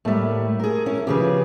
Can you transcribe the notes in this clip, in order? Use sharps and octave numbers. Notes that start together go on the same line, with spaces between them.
A2 G3 A3 A#3 E5
G#4 A#4
C#4 E4 C#5
C#3 F3 B3 G4 G#4 B4